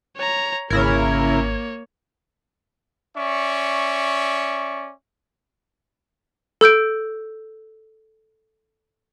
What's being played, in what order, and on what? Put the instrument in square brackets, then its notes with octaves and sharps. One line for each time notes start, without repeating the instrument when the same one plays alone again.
[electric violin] C#5 A#5
[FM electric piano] G#1 G#6 [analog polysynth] C#3 E4 A#4 [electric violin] A#3 C#5
[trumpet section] C#4 D5 E5 C#6
[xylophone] A4 E6 G6 D7